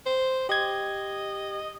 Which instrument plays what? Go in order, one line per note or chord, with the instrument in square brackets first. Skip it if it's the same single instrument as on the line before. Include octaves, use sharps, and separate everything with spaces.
[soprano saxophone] C5
[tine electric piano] G4 G#6 [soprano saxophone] D#5